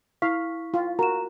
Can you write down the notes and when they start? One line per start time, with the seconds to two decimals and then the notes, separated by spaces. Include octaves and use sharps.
0.22 E4 F5 C#6 B6
0.74 F4
0.99 F#4 A#4 A#5 E7